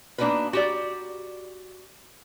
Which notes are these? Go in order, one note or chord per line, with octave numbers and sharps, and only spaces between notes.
A#3 B3 D4 D#4 F#4 B4
F#4 G4 D5